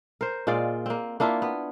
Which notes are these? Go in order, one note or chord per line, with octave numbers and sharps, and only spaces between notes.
A#4 C5
A#2 G#3 F4 D5
A#3 C4
A#3 D4 E4 F4
B3